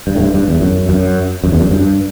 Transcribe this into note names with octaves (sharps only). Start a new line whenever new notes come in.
G2
A2
G2
G2
E2
F#2
F#2
F#2
E2
F#2
G2